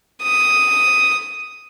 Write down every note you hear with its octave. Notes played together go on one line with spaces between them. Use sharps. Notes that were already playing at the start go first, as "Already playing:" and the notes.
D#6